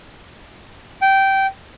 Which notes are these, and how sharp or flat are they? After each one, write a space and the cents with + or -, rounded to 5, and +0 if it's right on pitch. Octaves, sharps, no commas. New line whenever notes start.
G5 -15